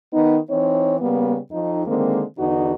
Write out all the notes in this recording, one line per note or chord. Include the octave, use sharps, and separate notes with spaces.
D#3 B3 D#4
E3 C4 D#4 C#5
C#3 G3 A#3 B3
F2 D#4
D3 D#3 G#3 A#3 C4
E2 D3 B3 D#4 F#4